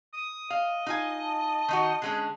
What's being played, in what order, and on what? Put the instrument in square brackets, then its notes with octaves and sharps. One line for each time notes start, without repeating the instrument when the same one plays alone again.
[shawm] D#6
[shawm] D#5 [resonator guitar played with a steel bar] F5
[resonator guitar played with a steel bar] D#4 F4 G#5
[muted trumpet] A5
[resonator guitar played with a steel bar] D#3 D#4 F#4
[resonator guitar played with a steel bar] D3 G#3 C#4 [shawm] G#4